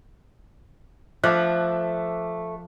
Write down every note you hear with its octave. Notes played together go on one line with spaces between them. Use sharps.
F3 A3 E5 D6 F#6